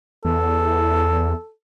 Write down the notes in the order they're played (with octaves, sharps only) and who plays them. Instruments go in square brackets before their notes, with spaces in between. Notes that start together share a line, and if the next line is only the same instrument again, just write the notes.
[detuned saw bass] E2 [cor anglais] A4